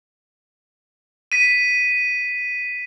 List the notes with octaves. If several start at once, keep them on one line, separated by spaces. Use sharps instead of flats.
B6 D#7